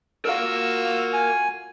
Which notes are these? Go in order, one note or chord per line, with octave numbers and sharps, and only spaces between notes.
F4 F#4 A#4 F5 E6
G#5